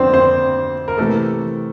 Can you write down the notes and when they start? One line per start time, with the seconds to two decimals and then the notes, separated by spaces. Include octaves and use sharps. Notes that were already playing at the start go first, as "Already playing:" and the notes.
Already playing: F2 D3 F3 C4 D4 C5
0.12 C4 C5
0.88 A#4
0.98 C3 E3 A3 A#3 A4